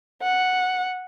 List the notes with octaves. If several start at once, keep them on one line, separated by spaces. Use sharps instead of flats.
F#5